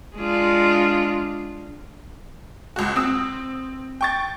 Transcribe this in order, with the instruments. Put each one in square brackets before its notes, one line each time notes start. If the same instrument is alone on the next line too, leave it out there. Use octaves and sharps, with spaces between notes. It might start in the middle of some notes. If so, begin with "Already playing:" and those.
[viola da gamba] G#3 D4 F4
[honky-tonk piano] C#2 F#4
C4 D#6 E6
G5 C#6 A6